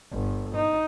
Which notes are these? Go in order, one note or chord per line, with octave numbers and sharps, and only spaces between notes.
G1
D#4